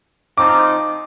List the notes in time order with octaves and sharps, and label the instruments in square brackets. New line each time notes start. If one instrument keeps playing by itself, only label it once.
[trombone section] F3 C4 D#4 [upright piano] D6